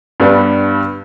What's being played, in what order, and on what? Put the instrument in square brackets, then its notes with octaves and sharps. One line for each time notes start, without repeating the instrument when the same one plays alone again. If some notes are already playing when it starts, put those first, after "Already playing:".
[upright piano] G2 G3 B3 D4